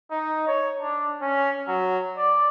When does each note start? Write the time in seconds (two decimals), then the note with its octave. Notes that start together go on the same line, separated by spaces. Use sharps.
0.11 D#4
0.48 C#5
0.80 D4
1.22 C#4
1.68 F#3
2.18 D5